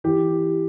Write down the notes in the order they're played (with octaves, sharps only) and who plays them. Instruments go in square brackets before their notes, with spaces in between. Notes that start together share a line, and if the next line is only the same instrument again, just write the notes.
[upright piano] E3 G4